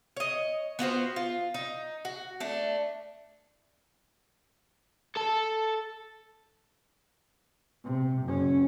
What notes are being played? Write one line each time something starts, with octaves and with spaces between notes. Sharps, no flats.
C#5 D#5
B3 F4 F#4 C5
F4
D#4
F#4
A3 D4
A4 A5
C3
F#1 C#4